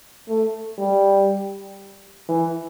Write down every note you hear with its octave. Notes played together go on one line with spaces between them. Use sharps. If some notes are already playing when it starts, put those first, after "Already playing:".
A3
G3
E3